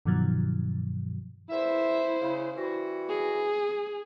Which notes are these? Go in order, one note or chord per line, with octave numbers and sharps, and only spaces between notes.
G2 B2 D#3 F3 F#3
E2 A#2 E4 C5 E5
C#3
E3 G3 F#4
G#4